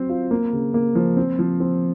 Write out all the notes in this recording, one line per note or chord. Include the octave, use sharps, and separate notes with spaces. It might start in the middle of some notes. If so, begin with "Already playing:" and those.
Already playing: F#3 C4 C5
F4
A#3
C#3
A#3
F3
C4
F3
C4